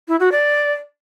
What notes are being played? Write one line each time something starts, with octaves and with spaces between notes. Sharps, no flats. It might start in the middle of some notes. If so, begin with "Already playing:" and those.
E4
F#4
D5